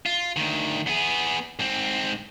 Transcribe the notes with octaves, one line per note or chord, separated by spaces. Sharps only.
F4
D2 D#3
B3 G#4
G#2 C4